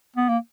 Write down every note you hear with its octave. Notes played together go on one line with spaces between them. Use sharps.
B3
A#3